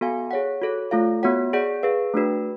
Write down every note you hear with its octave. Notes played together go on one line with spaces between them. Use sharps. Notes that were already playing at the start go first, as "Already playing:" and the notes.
B3 F#4 A4 F5 G#5
G#4 C#5 F#5
F#4 A4 C#5
A3 F4 A4 F5
B3 F#4 C#5 F#5
G#4 D5 F#5
G#4 B4 F5
A3 D4 F#4 B4